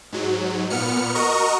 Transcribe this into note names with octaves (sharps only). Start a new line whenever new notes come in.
G#2 F#3
A#2 B3 F6 C#7
F#4 A#4 D#5 A#5 C#6